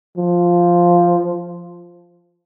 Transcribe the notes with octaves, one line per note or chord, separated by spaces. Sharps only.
F3